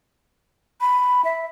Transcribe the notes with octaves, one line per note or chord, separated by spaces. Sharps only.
B5
E5